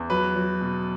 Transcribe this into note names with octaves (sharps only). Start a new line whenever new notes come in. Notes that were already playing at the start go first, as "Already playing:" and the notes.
Already playing: E2
F#3 B4
F#3
B2